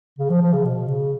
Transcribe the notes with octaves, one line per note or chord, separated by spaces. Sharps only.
C#3
F3
F3
C#3
B2
C#3